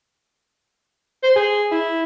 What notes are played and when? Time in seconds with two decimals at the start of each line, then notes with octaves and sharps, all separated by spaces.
1.23 C5
1.35 G#4
1.71 E4